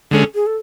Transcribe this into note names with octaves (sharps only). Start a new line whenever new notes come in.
D3 G#3 C#4 A4
G#4
A4